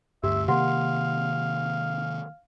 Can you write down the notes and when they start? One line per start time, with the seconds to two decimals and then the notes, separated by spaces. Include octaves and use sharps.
0.24 D2 G2 G4 E5
0.48 C3 D#3 A#3 G4 F5 F#5 C6